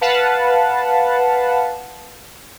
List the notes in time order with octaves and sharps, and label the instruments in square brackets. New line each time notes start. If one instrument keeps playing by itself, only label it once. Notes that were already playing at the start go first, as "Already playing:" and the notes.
[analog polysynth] B4 F5 F#5 A5